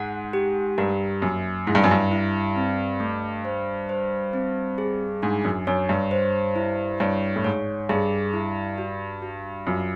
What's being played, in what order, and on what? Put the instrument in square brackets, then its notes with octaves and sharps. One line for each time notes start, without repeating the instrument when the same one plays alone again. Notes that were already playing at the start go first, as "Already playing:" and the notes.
Already playing: [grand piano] G#2 [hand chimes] F#5
[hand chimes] G4
[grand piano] G2 [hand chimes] A#4
[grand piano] F#2 [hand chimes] A#3
[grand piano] G#2 [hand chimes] E4
[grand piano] G2
F#2
G2
[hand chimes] E4
C4
A3
C5
C5
C4
G#4
[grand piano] G#2 [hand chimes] D4
[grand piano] F#2
[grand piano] F#2 [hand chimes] C#5
[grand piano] G2
[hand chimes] C5
E4
[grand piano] G2 [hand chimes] C#5
[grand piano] A2
[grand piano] G#2 [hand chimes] C#5
[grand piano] G2 [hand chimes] G#4
[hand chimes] E4
F#4
F#4
[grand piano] F#2 [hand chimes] F4